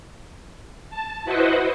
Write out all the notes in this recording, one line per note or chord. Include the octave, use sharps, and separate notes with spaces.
A5
E4 F#4 B4 C5 D#5 F#5